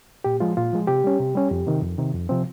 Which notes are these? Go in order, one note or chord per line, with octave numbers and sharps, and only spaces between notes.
A#2 G4
F3 G#3 F4
A#2 F4
F3 G#3
C3 G4
G3 C#4
C3
G3 C#4
F2
C3 D#3
F2
C3 D#3
F2
C3 F3 C4